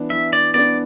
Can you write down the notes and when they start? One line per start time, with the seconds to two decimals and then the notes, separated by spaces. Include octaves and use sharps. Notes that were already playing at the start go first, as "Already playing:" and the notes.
Already playing: E3 B3 D4
0.10 E3 E5
0.33 D5
0.54 B3 D4 D5